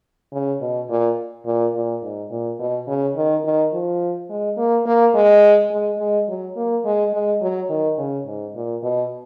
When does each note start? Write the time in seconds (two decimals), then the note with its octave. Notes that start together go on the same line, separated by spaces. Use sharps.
0.33 C#3
0.61 B2
0.89 A#2
1.46 A#2
1.74 A#2
2.03 G#2
2.31 A#2
2.59 B2
2.87 C#3
3.16 D#3
3.44 D#3
3.73 F3
4.30 G#3
4.57 A#3
4.86 A#3
5.14 G#3
5.71 G#3
5.99 G#3
6.28 F#3
6.56 A#3
6.85 G#3
7.13 G#3
7.41 F#3
7.69 D#3
7.98 C#3
8.26 G#2
8.55 A#2
8.83 B2